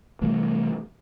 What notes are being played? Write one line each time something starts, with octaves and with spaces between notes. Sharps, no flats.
C3 E3 G3 A3